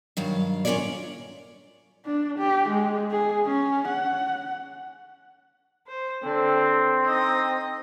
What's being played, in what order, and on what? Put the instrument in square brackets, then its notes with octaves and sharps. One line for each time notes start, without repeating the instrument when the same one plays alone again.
[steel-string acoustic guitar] G2 D#3 F#3 F5
C#4 F4 G4 A#4 C#5 D5
[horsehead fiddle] D4
G4
G#3
G#4
C#4
F#5
[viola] C5
[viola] D3 [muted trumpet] C4
[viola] D#4 D#5